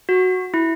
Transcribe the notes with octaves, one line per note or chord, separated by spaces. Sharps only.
F#4
E4